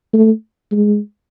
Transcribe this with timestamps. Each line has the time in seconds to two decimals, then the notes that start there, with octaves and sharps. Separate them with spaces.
0.13 A3
0.72 G#3